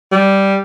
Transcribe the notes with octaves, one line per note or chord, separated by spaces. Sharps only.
G3